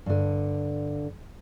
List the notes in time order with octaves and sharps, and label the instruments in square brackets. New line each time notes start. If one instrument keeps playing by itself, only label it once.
[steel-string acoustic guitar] G2 D3